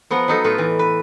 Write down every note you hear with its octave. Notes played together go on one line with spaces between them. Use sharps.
F3 B3 F#5 A#5
F#3 D#4 A4
A2 A3 F4 B4
E3
B4